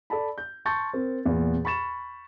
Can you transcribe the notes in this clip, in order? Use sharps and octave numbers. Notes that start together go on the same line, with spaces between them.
A4 D5 A5 B5
G6
A5 C6 C#6 G6 A6
C4 A#4
E2 A#2
B5 C#6 A6 E7